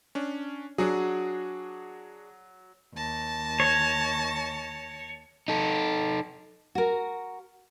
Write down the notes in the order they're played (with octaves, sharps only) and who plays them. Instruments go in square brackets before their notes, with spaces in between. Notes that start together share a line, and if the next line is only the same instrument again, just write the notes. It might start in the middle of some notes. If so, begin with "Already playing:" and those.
[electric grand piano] C#4 D4
[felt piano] F#3 [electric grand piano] D4 F#4 G#4
[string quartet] D#2 A5 A#6
[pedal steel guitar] C#5
[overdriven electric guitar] D#4 A4
[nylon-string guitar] F#4 A#4